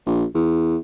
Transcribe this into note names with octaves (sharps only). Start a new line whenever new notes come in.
A#1
E2